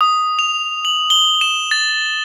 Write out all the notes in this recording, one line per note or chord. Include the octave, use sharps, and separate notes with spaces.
D#6
F7
F#7
G7
E7
A6